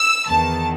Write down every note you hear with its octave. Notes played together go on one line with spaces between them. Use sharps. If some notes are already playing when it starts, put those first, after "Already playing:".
Already playing: E6
E2 D#3 A5